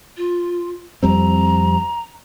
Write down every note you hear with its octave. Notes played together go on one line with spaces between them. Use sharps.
F4
F2 G3 C4 A#5